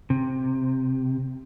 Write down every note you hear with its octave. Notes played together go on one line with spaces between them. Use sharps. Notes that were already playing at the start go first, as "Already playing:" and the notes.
C3